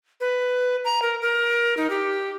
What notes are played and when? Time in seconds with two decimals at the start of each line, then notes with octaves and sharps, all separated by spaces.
0.20 B4
0.85 A#5
1.02 A#4
1.22 A#4
1.77 D#4
1.90 G4